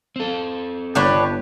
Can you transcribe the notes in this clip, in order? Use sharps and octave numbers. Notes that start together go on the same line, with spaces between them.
C4 A4
G1 D4 G4 B4 C#5